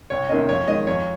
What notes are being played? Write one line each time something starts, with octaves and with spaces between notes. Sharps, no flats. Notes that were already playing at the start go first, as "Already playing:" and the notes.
C2 C#5
C3 D#3 A#3 C#4 D#5
F2 C#5
D#3 G#3 D#5
F2 C#5